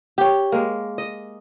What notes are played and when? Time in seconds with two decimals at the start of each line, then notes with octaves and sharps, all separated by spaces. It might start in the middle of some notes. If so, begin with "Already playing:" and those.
0.18 G4 C#5
0.52 G#3 A#3
0.98 D#5